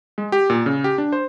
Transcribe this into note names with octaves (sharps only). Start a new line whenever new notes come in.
G#3
G4
A#2
C#3
G4
D4
C5